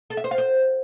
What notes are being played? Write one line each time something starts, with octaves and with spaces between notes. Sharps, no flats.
A4
E5
C5
F5
C5